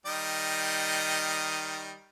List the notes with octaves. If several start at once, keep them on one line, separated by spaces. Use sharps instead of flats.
D#3 G3 D#5